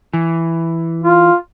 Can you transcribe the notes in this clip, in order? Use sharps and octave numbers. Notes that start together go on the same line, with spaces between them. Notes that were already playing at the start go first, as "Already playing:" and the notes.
E3
F4